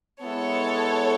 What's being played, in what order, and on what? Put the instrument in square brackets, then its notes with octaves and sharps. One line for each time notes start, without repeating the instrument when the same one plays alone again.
[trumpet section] G#3 B3 E4 [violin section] A4 C#5